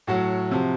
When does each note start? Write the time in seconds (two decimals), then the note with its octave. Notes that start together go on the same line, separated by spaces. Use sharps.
0.07 A2 F#3 F#4
0.51 C3 F3